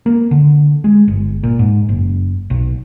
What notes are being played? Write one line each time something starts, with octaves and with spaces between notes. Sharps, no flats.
A#3
D3
G#3
G1
A#2
G#2
F#1
B1